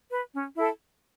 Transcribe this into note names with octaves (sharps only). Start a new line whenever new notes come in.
B4
C#4
E4 A4